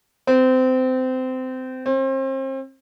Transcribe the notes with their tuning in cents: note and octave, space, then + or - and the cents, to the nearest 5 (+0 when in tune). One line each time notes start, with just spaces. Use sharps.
C4 -25
C4 +35